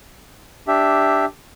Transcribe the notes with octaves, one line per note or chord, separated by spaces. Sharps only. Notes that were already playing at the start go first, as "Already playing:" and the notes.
D4 G4 E5